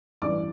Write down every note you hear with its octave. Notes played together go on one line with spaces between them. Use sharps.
A1 G2 E3 D5 D6